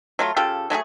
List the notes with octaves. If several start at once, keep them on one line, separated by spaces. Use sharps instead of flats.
F#3 A3 F4
C#3 F4 G4 A4
F#3 A3 F#4 G#4